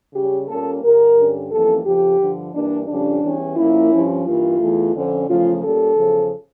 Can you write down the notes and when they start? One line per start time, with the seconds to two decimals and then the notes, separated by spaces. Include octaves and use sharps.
0.13 C#3 G3 C#4 G4
0.48 A#2 G3 A#3 C#4 A4
0.83 G2 D3 G3 A#4
1.17 G2 D3 G3 C#4
1.51 F2 E3 G3 A#3 C#4 A4
1.85 F2 C#3 F3 G4
2.19 G2 D3 F3
2.54 G2 E3 G3 A#3 D4
2.87 F2 C#3 G3 C#4 D4
3.22 E2 E3 G3 C#4
3.56 A#2 F3 A#3 C#4 E4
3.90 G2 F3 C#4
4.25 G2 E3 A#3 F4
4.59 E2 E3 A3
4.93 F2 D3 F3 C#4
5.27 E2 C#3 F3 A3 C#4 F4
5.62 A#2 G3 C#4 A4
5.96 E2 C#3 F3